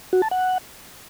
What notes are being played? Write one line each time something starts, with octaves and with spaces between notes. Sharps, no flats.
F#4
A5
F#5